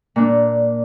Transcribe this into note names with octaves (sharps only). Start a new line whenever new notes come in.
A#2 D4